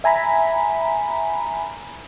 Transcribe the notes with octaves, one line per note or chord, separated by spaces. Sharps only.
E5 G#5 A#5 B5 B6